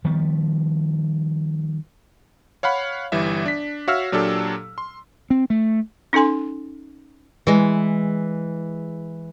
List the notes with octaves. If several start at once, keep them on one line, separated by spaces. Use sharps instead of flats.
D#3 F3 G3 B3
C#5 F5 F#5 B5
G1 E3 G3 E5
D4 B6
F#4 C#5 E5 F5 E6 F6
A#2 F#3 D4 G4 A4
C6
C4
A3
C#4 D#4 A4 G#5 C6
E3 G#3